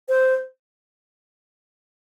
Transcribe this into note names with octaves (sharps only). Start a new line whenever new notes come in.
C5